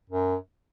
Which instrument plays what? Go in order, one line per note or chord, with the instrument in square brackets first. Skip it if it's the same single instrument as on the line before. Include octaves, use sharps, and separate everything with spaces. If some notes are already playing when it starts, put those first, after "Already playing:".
[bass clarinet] F#2